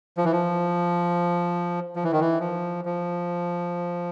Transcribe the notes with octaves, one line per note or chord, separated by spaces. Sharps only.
F3
E3
F3
F3
E3
D#3
E3
F3
F3